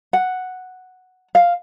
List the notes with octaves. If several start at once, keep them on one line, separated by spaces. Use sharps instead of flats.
F#5
F5